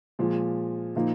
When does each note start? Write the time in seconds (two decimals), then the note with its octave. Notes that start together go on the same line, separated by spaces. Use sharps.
0.19 A#2 F3 G#3
0.96 A#2 F3 A#3 D#4